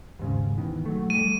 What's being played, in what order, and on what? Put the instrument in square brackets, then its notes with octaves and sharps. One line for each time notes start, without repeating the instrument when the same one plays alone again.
[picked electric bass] D#2 G#2 C#3
B2 D#3 E3
F#3 A3
[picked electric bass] G3 A3 [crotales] D#7